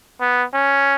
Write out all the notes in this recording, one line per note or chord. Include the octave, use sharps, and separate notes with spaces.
B3
C#4